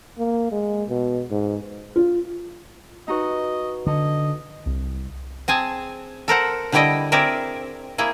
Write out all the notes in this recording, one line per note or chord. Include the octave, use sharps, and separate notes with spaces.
A#3
G#3
B2
G#2
F4
D#4 F#4 B4 D#5
D3 D#5
C2
C4 G#4 G#5 A5
A4 A#4 C5 F#5
D3 G3 D4 E4 D5 D#5
C4 G#4 A#4 D5 E5
A#3 E4 G#4